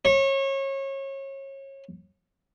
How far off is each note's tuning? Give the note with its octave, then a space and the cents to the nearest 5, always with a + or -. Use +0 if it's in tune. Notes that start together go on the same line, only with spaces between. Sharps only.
C#5 -30